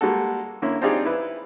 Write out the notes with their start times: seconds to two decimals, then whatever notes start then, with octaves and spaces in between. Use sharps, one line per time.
0.01 G3 G#3 A#3 F#4 A4
0.62 D3 A#3 C#4 E4
0.82 C4 D4 D#4 F4 G4 G#4
1.05 E4 B4